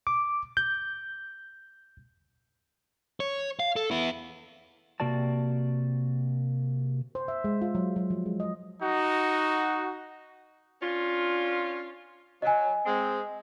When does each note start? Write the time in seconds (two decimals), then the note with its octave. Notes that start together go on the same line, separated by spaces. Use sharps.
0.07 D6
0.57 G6
3.20 C#5
3.60 F5
3.76 A4
3.91 B3 E4
5.00 C3 A#3 F#4 D5 A5
7.15 C5
7.28 E5
7.44 G#3
7.62 F4
7.75 F#3
7.96 F#3
8.10 F3
8.26 G#3
8.40 D#5
8.81 D#4 F#4
10.82 C#4 D4 F4
12.42 F#3 D#5 G#5
12.86 G#3 C4